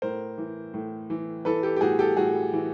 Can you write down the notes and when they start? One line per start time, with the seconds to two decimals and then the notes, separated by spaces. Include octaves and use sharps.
0.02 A2 A#4 C5
0.38 E3
0.74 A2
1.10 E3
1.45 E3 A4 B4
1.63 G4 A4
1.76 G4
1.81 A2 F#4 G#4
1.99 G4 A4
2.17 A2 F#4 G#4
2.54 E3